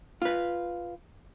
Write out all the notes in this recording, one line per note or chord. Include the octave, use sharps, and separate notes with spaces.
F4 B4